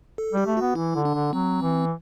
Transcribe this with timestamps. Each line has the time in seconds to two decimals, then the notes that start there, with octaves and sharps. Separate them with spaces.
0.18 A4
0.33 G3 G4
0.46 A3
0.57 B3 F#4
0.75 E3 E4
0.95 D3
1.05 D4
1.15 D3
1.33 F#3 C4
1.62 E3